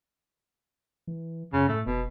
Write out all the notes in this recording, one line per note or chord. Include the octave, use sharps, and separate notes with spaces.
E3
F#2 C#3
A2 A3
F1 B2